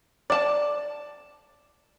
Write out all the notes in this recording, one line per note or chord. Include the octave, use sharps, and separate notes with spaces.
D5 A5